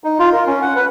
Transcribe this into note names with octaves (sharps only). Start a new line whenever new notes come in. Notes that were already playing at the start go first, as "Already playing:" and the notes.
D#4
F4
A#4
C#4
F#5
B4